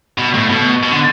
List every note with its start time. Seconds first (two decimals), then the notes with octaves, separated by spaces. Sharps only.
0.18 B2
0.34 A2
0.50 B2
0.83 B2
0.92 D3